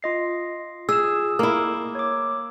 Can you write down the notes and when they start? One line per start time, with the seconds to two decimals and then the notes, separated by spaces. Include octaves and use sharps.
0.03 F4 D#5 C7
0.89 G#4 E6 E7
1.39 A#3 E4
1.95 C#5 D6